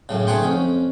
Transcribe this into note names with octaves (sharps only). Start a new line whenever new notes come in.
F#2 A2 C#3
B1 A3 G#4 F#5 G5 C6
F2 C#4